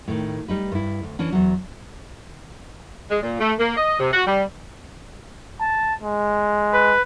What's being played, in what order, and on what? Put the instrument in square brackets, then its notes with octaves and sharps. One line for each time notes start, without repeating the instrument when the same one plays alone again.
[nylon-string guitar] A2 D#3
G3 D#4 B4
G2 E4
D2
E3 C#4 D4
E2 F#3
[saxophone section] G#3
A#2
A3
A#3
D#5
C3
F#4
G3
[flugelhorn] A5
G#3
[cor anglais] B4